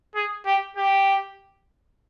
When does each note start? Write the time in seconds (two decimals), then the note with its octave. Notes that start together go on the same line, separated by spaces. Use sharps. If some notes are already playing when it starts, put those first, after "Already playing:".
0.15 G#4
0.46 G4
0.77 G4